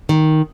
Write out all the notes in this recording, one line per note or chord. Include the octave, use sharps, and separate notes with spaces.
D#3